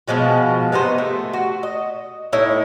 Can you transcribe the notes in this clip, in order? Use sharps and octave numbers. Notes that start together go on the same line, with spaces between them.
B2 F3 G#3 F#4
C3 B3 D#4 C5
A3
F#4
D#5
A2 D#4 E4 C#5